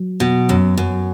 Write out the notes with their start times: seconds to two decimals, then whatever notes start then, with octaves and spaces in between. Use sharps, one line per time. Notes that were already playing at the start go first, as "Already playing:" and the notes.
Already playing: F#3
0.20 B2
0.49 F#2
0.78 F#2